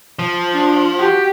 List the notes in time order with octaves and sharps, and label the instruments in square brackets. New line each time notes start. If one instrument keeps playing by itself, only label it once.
[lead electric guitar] F3
[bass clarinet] D4
[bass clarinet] F#4 [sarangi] G4